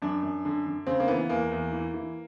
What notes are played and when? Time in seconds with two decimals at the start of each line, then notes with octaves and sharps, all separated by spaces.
0.02 F#2 D4
0.23 F#2
0.45 D3
0.66 D3
0.87 C#3 C4
1.00 A#3
1.08 E3 B3
1.29 E2 A#3
1.52 E2
1.72 E3
1.94 E3